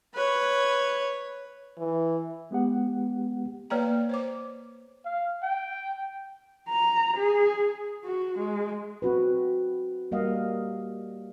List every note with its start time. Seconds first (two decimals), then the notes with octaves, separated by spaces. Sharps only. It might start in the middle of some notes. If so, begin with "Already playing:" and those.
0.14 B4 C#5
1.79 E3
2.51 G#3 B3 G4 F#5
3.70 A#3 B4 C#5 D5 G5 A#5
4.09 C5 C#5 D6
5.05 F5
5.43 G5
6.69 A#5
7.17 G#4
8.05 F#4
8.38 G#3
9.02 C4 F#4 B4
10.11 G3 A#3 D#5 F5 F#5